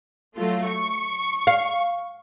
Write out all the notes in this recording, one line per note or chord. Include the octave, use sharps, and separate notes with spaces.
F#3 A3 F4
C#6
F5